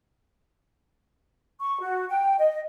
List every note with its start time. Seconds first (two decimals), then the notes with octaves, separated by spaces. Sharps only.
1.60 C#6
1.80 F#4
2.09 G5
2.38 D#5